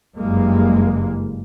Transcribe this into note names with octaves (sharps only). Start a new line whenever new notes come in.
F#1 G2 G#3 A#3